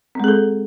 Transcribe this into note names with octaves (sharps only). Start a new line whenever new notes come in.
G#3 C4 G#4 A4